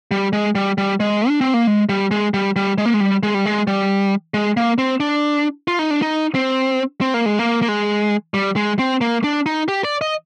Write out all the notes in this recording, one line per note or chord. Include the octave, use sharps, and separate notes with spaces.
G3
G#3
G3
G3
G#3
D4
C4
A#3
G#3
G3
G#3
G3
G3
G#3
A#3
G#3
G3
G#3
G3
G#3
G3
G#3
A#3
C4
D4
F4
D#4
D4
D#4
C4
C4
A#3
G#3
A#3
A#3
G#3
G3
G#3
C4
A#3
D4
D#4
G4
D5
D#5